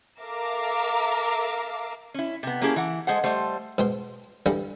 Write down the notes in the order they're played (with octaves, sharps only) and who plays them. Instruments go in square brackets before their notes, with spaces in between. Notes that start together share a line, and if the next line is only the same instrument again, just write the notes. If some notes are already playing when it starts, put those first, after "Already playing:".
[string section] A4 A#4 E5 F5 A#5 D6
[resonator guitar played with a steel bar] C#4 E4
C3 B3
A#3 C#4 E4 G4 G#4
E3 F#5
G#3 G#4 A4 C5 F#5
G3 A3 C5
[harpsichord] G#2 B2 C6
G2 D3 E3 G3